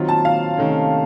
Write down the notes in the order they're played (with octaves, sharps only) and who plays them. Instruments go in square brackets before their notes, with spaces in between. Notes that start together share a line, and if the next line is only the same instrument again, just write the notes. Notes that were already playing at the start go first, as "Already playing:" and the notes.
Already playing: [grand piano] D#3 F#3 C4 F4
[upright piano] A5
F5
[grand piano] C3 D#3 A3 C#4